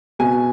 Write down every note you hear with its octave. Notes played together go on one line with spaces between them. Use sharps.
B2 G#5